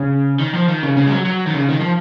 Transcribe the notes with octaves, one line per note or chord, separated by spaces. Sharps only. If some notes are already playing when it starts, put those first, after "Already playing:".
Already playing: C#3
D#3
F3
D#3
C#3
C#3
G#3
F#3
F#3
D#3
C#3
D#3
F3